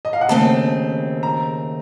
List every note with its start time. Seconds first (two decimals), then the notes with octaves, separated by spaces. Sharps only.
0.05 D#5
0.13 F5
0.21 F#5
0.29 D#2 C#3 A3 C4 A5
1.23 A#5